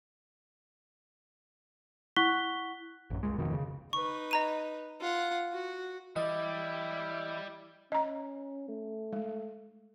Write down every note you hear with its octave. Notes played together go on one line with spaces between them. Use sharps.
E4 F#5 C#6 F#6 B6 G7
A1 F#2
C2 G#3
D1 F2 B2 D#3
C#3
D#4 B4 C#6
D#5 A#5 D#7
F4 F#5
F#4
E3 G3 E4 D5 D#5
C#4 D#5 A#5
A3
G#3